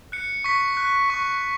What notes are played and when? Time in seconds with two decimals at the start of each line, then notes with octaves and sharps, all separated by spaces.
0.12 F#6 C#7
0.44 C#6 B6
0.77 F#6
1.10 C#6